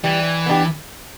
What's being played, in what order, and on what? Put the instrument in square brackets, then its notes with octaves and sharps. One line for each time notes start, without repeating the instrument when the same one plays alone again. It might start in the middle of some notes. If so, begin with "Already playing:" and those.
[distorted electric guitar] E3 [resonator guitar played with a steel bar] G3
[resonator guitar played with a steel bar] B3 D4 G4